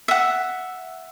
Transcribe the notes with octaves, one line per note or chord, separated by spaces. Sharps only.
E5 F#5